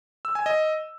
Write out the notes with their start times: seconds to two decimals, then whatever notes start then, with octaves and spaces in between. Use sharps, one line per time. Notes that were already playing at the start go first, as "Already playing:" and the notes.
0.25 E6
0.35 G#5
0.46 D#5